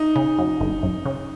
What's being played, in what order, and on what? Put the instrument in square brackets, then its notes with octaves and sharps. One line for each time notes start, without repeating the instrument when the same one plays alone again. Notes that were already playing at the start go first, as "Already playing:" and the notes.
Already playing: [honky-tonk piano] D#4
[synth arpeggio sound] C#3
F#2
G1
F#2
C#3